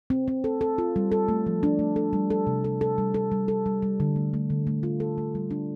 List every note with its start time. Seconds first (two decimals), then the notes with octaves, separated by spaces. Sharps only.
0.10 C4
0.28 C4
0.44 A4
0.61 A4
0.78 F4
0.96 G3
1.12 A4
1.28 A3
1.46 F3
1.63 D4
1.79 A3
1.96 A4
2.13 G3
2.30 A4
2.47 C3
2.64 A4
2.81 A4
2.98 G3
3.14 A4
3.32 G3
3.48 A4
3.66 G3
3.82 G3
4.00 D3
4.16 A3
4.34 A3
4.50 D3
4.67 A3
4.83 F4
5.00 A4
5.18 A3
5.35 G3
5.51 D4